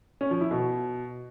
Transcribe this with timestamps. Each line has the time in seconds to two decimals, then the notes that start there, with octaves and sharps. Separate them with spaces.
0.21 C#4
0.31 F3
0.41 E4
0.51 B2